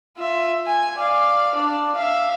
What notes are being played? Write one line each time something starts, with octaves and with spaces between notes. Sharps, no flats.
F4 E5
G#5
D5 F5
D4 D5
E5 F5